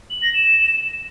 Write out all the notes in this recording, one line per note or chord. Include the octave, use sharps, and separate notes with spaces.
F#7
A#6
E7